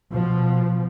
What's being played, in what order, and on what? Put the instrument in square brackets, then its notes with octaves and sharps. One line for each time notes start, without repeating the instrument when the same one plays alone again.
[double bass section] B2 F3